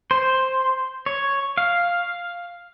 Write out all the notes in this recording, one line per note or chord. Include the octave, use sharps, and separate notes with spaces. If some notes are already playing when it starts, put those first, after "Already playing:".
C5
C#5
F5